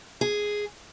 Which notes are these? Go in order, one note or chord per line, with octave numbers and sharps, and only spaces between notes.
G#4